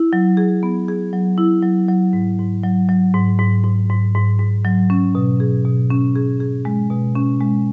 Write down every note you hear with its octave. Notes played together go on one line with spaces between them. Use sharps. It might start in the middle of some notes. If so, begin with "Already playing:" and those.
Already playing: E4
F#3
G#4
B3
G#4
F#3
E4
F#3
F#3
G#2
G#2
F#3
F#3
G#2
G#2
G#2
G#2
G#2
G#2
F#3
C#4
B2
G#4
B2
C#4
G#4
G#4
G#3
B2
C#4
G#3